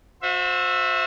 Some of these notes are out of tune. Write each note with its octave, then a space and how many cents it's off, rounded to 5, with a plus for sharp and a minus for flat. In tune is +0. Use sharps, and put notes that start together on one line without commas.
F#4 -40 C5 +0 E5 +10